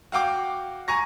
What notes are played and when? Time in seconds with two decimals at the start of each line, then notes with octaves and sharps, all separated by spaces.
0.12 F#4 F5 G5 D6
0.88 G#5 A#5 C#6 A#6